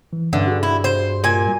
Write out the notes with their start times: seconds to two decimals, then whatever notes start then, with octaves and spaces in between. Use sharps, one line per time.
0.13 E3
0.33 G2 D3 C#4 E5
0.47 F#4 G#4
0.63 E4
0.84 C5
1.24 A#2 G#5